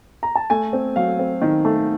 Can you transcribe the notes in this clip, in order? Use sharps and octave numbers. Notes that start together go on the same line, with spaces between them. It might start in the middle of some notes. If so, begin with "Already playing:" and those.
A#5
A5
A3 G#5
C4
F#3 F5
C4
D#3
A3